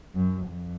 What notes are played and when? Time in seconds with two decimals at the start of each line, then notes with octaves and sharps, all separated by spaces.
0.15 F#2
0.48 F2